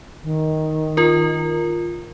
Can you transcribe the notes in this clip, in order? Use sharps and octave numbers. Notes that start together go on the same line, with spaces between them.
D#3
F4 A#4